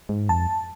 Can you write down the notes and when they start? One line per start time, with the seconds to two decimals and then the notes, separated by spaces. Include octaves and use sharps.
0.09 G#2
0.29 F2 A5